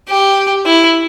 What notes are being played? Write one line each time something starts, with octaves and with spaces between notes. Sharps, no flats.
G4
E4